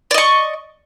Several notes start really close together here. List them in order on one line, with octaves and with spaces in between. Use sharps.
D5 D#5 C#6